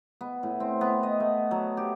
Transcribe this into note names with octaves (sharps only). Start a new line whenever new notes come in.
B3
A2
C4
B3
D#5
A3
F#3
G4